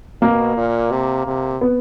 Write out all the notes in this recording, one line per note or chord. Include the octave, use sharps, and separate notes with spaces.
B2 A#3
A#2
C3
C3
B3